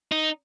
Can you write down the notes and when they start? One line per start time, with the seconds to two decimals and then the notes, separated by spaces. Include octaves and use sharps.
0.12 D#4